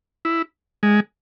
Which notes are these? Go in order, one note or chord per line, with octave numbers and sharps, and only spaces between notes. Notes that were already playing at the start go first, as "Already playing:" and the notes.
E4
G#3